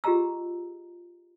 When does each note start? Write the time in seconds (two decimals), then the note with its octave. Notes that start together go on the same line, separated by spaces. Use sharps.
0.04 F4 G4 G#4 D#5 A#5 E6